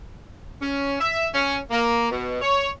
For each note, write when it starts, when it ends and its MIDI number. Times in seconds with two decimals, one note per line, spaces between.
0.61 0.95 61
1.00 1.27 76
1.34 1.57 61
1.71 2.11 58
2.11 2.38 47
2.41 2.69 73